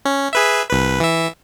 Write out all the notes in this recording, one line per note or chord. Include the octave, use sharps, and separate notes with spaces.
C#4
G#4 B4 E5
C2 B4
E3 E5